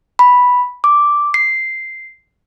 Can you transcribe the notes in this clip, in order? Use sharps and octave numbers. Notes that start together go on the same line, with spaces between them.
B5
D6
C7